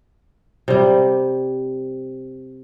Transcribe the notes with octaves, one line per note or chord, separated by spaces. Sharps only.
C3 G3